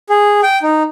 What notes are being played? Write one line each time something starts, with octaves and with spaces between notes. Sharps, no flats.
G#4
G5
D#4